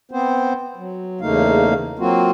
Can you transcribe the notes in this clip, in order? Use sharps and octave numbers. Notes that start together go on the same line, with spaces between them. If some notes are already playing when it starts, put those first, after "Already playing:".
B3 C4 C5
F#3
E2 C#3 A3 A#3 D#4 F5
F#3 A#3 C4 F4 F#4